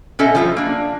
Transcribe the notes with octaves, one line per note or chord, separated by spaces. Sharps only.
B2 C#4 A4 D#5 E5
F3 G3 F4 A#4 E5
A#3 D4